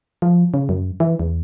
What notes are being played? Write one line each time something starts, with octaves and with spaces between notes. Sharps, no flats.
F3
C#3
F#2
E3
E2